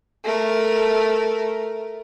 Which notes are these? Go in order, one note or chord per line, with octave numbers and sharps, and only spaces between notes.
A3 A#4